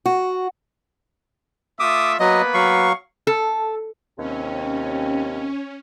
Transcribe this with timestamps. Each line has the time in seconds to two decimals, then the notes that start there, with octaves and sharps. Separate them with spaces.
0.06 F#4
1.80 A3 F4 E5 D6 D#6
2.20 F#3 A#3 B3 B4 D#5
2.54 F#3 F5 C#6
3.27 A4
4.18 D#2 C3 C4 C#4